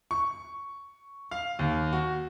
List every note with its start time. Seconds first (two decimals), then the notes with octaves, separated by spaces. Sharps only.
0.11 C#6
1.31 F5
1.59 D#2
1.93 F#4